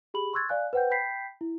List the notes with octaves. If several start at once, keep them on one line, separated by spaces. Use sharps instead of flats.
G4 G#4 B5 F#7
C6 C#6 E6 F#6 G#6 A6
D5 F5 G#5 F#6
B4 C5 F#5 G5 G6
G5 B5 G6 B6 C7
E4